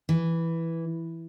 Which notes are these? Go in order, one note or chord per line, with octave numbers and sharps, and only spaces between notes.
E3